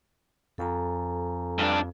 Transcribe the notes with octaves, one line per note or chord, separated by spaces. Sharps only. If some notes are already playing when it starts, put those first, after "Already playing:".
F2 A4 G#5 A#5
G2 D4